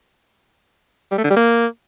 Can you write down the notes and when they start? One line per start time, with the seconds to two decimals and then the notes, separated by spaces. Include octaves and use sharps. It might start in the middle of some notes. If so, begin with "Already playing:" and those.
1.12 G3
1.18 A3
1.24 D3
1.30 G3
1.37 A#3